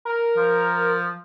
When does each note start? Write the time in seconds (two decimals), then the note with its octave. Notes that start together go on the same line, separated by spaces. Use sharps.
0.05 A#4
0.37 F3